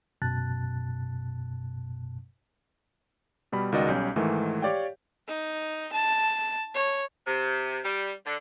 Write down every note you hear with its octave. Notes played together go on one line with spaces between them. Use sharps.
G1 F#2 B2 A5 F#6 A6
B2 G3 B5
C#2 D#3 F#4 D5 D#5
B1 G3 C#4 G6
G#2 D#3 E3 A3
G4 C#5 D5 F5 G5
D#4
A5
C#5
C3
G3
D3